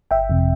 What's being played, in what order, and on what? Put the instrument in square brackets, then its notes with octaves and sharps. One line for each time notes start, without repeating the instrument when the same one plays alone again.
[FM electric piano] G1 E5 G5
F2 C3